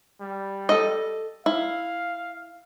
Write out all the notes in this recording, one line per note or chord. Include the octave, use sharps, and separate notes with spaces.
G3
A4 D#5
E4 F5